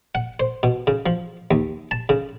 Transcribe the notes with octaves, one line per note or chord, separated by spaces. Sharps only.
F#5
C5
B2
C#3
F3
D#2
A5
C#3